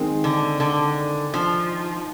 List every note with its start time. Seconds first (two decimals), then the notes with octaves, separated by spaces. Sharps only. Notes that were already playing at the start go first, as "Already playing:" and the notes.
Already playing: D#3 G#3 C4
0.24 D3
0.60 D3
1.34 F3